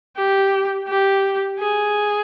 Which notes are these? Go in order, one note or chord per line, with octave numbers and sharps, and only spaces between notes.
G4
G4
G#4